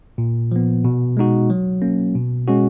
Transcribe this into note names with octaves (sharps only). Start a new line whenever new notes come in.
A#2
F3 B3
B2
G#3 D#4 F#4
F#3
A#3 C#4
B2
G#3 C#4 F#4